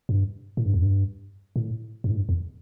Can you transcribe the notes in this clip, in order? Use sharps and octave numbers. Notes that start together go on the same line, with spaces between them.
G2
A2
G2
E2
G2
A2
G2
A2
G2
E2